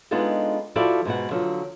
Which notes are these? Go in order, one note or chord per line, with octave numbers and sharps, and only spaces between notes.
G#3 B3 D4 D#4 F4 A4
F3 E4 F#4 A4 D5 F5
G#2 B2 F#5
D3 F3 F#3